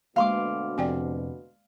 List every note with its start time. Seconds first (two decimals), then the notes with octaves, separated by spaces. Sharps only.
0.16 D2 B2 G#3 A#3 F5 C6 D6
0.78 F2 C3 D5 G5 G#5